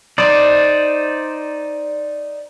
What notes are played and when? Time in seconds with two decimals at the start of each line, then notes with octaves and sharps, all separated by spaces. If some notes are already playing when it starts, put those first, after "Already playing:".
0.18 D#4 C5 D5